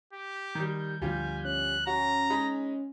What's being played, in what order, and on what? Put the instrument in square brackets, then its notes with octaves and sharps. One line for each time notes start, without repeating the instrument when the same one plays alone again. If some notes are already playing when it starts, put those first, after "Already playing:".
[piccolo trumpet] G4
[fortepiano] D#3 G3 [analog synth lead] G6
[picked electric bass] D2 D3 F3 [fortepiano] G3 F4 G4 [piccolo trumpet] G#5
[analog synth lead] C#4 [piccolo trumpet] F#6
[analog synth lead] C#4 [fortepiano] F#4 [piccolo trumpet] A#5
[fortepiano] G#3 D#4 B5